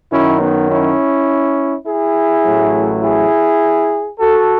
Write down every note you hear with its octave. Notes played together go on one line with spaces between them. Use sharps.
F#2 D#3 F#3 C#4 E4
B3 D#4
C#4 E4
E4 G#4
A1 A2 F#3
E4 G#4
F#4 A4